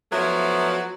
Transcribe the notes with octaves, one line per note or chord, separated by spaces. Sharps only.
F3 F#3 A3 B3 E4 F#4